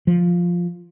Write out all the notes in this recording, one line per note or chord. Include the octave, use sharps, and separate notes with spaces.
F3